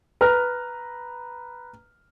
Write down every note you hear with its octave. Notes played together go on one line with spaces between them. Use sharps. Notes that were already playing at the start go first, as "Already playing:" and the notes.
B4 A#5 F6